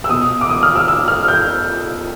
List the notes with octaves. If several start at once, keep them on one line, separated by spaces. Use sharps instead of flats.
E6
B2 D#6
D6
D#6
F6
E6
E6
F6
G6